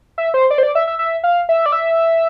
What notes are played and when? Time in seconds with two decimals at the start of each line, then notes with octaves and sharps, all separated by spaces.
0.18 E5
0.34 C5
0.51 D5
0.58 C5
0.63 D5
0.75 E5
0.87 E5
0.99 E5
1.24 F5
1.49 E5
1.66 D5
1.72 E5